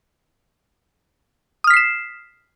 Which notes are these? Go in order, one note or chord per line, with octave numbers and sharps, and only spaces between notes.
D#6 F6 B6 C7 E7